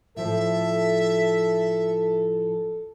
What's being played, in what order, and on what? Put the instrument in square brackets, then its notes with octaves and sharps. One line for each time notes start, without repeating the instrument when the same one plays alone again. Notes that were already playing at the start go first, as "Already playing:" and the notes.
[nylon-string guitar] A2 F3 [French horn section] A4 [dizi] E5